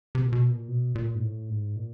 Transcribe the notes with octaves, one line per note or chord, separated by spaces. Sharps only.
C3
A#2
B2
A#2
B2
A#2
G#2
A2
G#2
A#2